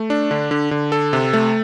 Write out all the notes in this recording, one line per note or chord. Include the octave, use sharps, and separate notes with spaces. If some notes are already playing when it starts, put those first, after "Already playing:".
Already playing: A3
D4
D3
D3
D3
A4
C3
A3